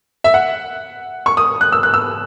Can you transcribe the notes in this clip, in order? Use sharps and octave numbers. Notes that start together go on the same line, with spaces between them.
E5
F#5
C#6
D#6
F#6
E6
F#6
E6